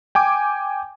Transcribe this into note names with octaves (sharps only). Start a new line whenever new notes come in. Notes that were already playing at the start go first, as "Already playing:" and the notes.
G5 G#5 D6